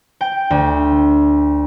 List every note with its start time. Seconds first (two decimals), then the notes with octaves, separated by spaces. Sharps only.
0.21 G5
0.50 D2